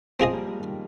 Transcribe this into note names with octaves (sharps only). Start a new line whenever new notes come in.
F3 G#3 C4 F4 G#4 D#5
G3 A#3
F3 G#3
D#3 G3